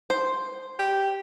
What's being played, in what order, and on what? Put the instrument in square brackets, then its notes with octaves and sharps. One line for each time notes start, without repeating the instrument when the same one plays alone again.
[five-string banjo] C5
[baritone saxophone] G4